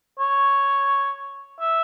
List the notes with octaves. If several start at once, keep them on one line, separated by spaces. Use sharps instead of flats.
C#5
E5